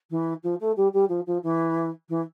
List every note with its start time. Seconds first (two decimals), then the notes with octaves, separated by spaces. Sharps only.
0.10 E3
0.43 F3
0.60 A3
0.76 G3
0.93 G3
1.08 F3
1.26 F3
1.43 E3
2.09 E3